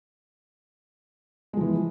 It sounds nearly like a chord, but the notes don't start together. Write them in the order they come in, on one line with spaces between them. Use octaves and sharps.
G#3 F3 E3